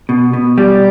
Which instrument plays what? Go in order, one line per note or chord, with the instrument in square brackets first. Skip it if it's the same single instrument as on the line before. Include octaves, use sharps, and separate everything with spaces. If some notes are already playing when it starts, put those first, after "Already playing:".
[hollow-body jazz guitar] B2
B2
[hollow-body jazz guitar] G3 [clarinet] D5